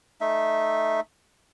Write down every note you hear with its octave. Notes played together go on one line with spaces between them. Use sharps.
A3 D#4 E5